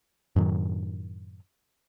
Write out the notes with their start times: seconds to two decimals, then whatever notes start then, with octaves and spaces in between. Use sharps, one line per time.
0.36 F#2 A2 D#3 F#3